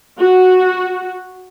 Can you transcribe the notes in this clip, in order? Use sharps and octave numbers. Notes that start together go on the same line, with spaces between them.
F#4